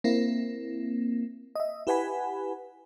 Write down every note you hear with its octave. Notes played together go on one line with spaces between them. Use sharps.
A#3 C4 E4
D#5 E5
E4 G4 B4 F#5 G#5 B5